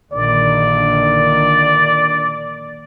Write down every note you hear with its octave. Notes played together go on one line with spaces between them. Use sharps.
A#1 D3 D#3 D5